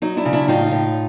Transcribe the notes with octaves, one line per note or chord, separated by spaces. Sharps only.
F#3 D#4
D4 E4
C#3
D4 E4
A2 D#4 F4
A2